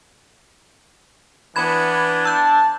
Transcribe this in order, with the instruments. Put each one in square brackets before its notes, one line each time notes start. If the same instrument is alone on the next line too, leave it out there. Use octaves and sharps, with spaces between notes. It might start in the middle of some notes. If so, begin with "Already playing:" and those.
[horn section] E3 B3 [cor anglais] D4 [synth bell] B5 G#6
[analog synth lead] A5 [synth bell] E6 G6